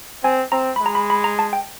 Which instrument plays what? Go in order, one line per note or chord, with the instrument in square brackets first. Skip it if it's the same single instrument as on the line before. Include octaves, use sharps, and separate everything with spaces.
[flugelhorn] C4 [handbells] G#5
[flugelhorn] C4 [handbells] A#5
[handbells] B5
[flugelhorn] G#3 [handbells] A#5
[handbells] B5
B5
A#5
A5
G5